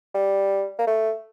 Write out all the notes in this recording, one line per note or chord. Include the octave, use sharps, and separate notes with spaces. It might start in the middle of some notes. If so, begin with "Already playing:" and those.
G3
A#3
A3